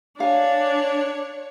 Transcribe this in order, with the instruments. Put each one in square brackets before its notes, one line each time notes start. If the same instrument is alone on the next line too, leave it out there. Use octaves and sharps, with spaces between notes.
[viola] D4 [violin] C#5 [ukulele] F5 G#5